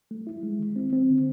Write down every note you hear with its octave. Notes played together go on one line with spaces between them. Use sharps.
A3
E4
G#3
D#3
C4
C4
D3